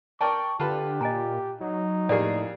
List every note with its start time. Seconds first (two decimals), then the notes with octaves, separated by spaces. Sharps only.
0.21 A#4 D5 G5 A5 C#6
0.60 D3 F4 G4 A4 B4
1.01 A#2 D#5 G#5 A#5
1.61 F#3 D#4
2.09 F2 A2 A#3 G4 G#4 D5